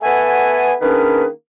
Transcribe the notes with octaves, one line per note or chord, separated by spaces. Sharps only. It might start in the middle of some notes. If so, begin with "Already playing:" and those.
A3 B3 A4 E5 F#5 G#5
D#3 A#3 C#4 D4 G#4 B4